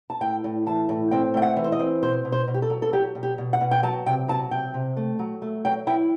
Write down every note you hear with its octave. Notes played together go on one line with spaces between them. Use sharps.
A5
A2 G5
A2
E3 A5
A2
C4 G5
A3 G5
F#5
E3
C5
D#5
C4
B2 C5
B2
C5
B2
G4
A4
F#3
A4
F#3 G4
B2
G4
B2
F#5
B2
G5
F#3 A5
C3 G5
F#3 A5
C3 G5
C3
A3
F#3
A3
F#3 G5
E4 G5